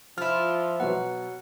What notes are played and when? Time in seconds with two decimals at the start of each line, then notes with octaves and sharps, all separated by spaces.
0.18 F3 E4 F4 F6
0.80 B2 F#3 B3 F#5